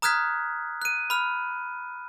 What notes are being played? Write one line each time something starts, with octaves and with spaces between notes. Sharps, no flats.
A#5 D#6 F6 F#6 G#6 B6
F#6 D#7
B5 F6